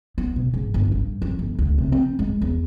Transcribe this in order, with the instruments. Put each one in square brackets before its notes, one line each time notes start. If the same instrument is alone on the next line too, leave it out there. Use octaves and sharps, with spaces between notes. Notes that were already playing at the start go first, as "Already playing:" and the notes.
[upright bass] B3
B2
G#2
G1
G2
F2
G1
D2
C3
C4
G#3
E2